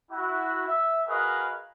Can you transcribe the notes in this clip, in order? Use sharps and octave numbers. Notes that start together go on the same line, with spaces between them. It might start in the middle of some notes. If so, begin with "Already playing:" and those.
E4 F#4
E5
F#4 G#4 A#4 B4 D#5 F5